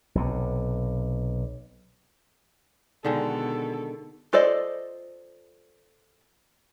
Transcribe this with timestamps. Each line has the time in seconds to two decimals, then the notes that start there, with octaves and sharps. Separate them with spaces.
0.15 B1 C3
3.04 B2 D3 D#3 G#3 A4
4.33 F4 A4 C5 D5 D#5